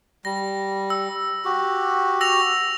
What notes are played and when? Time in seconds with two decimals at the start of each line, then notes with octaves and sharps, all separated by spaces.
0.25 G3 A#6
0.90 E6
1.45 F#4 G4
2.21 E6 A#6 F7